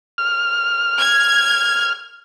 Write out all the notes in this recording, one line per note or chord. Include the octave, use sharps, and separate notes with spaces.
F6
G#6